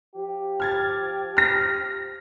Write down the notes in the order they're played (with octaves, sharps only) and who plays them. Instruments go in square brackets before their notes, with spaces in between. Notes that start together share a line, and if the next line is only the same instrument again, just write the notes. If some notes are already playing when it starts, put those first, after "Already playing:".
[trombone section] F3 G4
[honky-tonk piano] F6 G#6 A6
F6 A#6